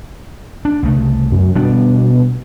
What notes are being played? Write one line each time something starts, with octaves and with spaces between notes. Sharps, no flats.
D4
C2 C#3 A3
F#2
B2 G3 B3 D4